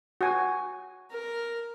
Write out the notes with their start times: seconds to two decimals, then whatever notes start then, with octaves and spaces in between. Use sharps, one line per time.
0.21 F#4 G#5
1.11 A#4